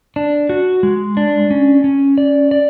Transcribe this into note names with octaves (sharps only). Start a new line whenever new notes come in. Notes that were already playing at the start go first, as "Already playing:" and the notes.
D4
F#4
G#3
D4
C#4
C#4
D5
D5